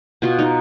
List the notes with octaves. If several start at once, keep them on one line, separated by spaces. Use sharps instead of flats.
B2 F4
D#4